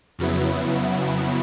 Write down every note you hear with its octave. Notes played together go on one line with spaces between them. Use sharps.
F2 C#3 F#3 B3 E4